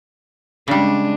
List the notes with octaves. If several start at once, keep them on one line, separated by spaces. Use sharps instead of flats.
C#3 G3 G#3 D4